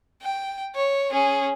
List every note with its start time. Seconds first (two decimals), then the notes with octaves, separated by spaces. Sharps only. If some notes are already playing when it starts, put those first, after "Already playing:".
0.22 G5
0.75 C#5
1.11 C#4 G#4